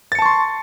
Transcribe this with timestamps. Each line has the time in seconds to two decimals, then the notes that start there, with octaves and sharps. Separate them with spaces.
0.12 A6
0.15 C#7
0.19 A5
0.22 C#6
0.26 C6